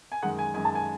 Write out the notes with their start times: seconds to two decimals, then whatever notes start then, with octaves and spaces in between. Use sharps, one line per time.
0.12 G#5
0.23 F#2 D#3 G#3 F#5
0.38 G#5
0.54 F#2 D#3 G#3 G#5
0.65 A5
0.75 G#5